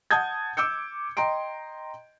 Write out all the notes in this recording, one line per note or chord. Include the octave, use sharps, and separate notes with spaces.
F#5 A5 D#6 G6 G#6
D6 E6 G6 C#7
D#5 G5 A#5 C6 D7